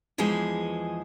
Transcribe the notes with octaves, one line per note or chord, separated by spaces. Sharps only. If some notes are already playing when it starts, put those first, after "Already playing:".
E2 E3 F3 G#3 G#4